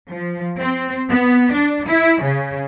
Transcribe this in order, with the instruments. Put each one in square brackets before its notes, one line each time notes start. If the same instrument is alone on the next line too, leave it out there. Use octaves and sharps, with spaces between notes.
[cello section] F3
C4
B3
D4
E4
C#3